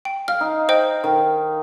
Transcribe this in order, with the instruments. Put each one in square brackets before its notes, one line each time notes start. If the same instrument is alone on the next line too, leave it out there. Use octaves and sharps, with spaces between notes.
[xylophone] G5
[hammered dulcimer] F5 [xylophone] F6
[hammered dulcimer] D#4
[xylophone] C5 D#5 G5
[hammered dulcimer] D#3